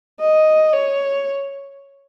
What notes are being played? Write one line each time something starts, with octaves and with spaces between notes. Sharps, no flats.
D#5
C#5